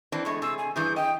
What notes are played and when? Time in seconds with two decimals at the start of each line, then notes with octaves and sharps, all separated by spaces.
0.12 E3 C4 D4
0.25 E2 G#3 A3 C#6
0.42 C3 G#4 E6
0.58 G#5
0.76 G2 E3 G#4 G6
0.96 D#5 G5